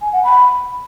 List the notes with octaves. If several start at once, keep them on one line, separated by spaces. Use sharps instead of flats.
G#5
F#5
B5